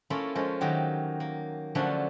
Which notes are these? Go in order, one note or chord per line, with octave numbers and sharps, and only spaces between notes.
A3 A#3 C#4 E4 F4
F3 G#3 A3 C#4
D#3 F#3 A#3 G4
A#3
D3 F3 F#3 A3 C#4 D4